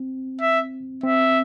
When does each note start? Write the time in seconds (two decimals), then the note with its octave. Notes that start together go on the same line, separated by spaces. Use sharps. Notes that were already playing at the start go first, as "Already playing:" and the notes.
Already playing: C4
0.41 E5
1.03 C4 E5